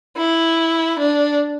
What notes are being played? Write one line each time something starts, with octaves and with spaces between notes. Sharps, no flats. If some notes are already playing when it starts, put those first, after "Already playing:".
E4
D4